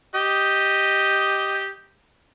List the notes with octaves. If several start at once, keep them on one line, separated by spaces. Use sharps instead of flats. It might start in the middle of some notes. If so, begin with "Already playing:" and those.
G4 D#5